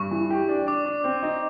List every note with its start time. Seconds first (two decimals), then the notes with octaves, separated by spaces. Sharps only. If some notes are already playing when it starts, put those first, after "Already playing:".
Already playing: G2 C#6
0.11 E3
0.30 G4
0.49 D4
0.67 D4 D6
0.85 D4
1.04 C4
1.23 D#4